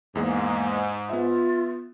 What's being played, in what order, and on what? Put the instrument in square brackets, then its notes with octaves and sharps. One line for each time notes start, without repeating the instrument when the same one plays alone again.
[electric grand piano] E2 G#3 [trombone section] G#2 [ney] A#3
[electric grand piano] B3 E5 [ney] F4